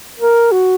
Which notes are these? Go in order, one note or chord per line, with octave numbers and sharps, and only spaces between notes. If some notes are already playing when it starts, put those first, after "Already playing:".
A#4
F#4